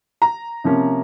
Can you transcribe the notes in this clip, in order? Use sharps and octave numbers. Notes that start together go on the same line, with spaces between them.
A#5
C3 F3 A#3 C#4